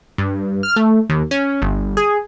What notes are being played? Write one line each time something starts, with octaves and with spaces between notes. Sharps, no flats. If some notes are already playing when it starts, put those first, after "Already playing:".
G2
F6
A3
D#2
C#4
G1
G#4